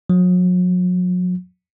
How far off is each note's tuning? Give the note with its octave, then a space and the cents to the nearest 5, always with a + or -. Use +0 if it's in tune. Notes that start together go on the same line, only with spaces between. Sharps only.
F#3 -40